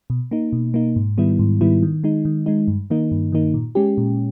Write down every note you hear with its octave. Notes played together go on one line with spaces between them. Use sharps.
B2
A#3 D#4
B2
A#3 D#4
G#2
D#3 G3 B3 E4
G#2
D#3 G3 B3 E4
D#3
G#3 D#4
D#3
G#3 D#4
G2
D#3 A#3 D#4
G2
D#3 A#3 D#4
A#2
G#3 C#4 G4
A#2